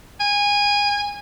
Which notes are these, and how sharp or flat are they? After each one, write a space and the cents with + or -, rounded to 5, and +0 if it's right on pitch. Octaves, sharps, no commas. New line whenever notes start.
G#5 -20